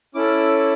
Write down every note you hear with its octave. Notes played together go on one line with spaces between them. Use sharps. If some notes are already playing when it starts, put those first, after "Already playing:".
C#4 E4 A4 D6